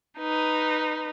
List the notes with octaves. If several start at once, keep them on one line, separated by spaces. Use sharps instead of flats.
D#4 B4